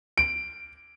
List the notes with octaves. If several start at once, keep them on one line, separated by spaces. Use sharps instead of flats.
D7